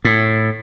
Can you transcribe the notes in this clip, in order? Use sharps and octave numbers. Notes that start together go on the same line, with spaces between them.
A2